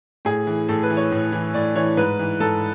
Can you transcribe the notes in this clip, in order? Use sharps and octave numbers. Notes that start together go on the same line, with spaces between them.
A2 G#4
E3
A2 A4
B4
E3
C#5
A2
E3
A2 D5
E3 C#5
G#2 B4
E3
G#2 A4